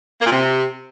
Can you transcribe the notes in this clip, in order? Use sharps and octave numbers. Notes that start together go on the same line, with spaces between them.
A#3
A#2
C3